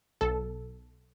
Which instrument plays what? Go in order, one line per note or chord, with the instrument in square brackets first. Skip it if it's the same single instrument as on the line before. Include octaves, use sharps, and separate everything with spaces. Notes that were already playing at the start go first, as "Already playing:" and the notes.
[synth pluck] B1 A4